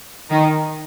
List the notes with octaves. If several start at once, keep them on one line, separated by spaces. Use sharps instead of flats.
D#3 D#4